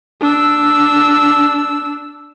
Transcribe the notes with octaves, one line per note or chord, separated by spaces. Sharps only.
D4 E6